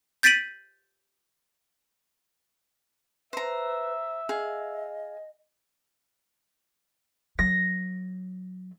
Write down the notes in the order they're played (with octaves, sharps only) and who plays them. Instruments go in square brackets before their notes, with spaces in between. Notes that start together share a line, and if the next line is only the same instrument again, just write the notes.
[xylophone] G6 A6 B6 D7 D#7 F#7
[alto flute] B4 [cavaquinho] C5 A#5 [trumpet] E5
[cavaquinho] G#4 F5 [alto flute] D#5
[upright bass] F#3 [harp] A#6